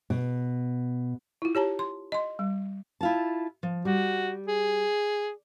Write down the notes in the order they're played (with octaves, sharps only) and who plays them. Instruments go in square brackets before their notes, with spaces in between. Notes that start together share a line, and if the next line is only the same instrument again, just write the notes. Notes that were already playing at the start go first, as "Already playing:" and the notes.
[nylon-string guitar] B2
[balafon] E4 F4
G4 C#5 A5 A#5
C6
D#5 C6
G3
[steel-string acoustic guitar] E4 F4 A5
F3
[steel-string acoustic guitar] G3 [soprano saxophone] F#4
[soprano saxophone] G#4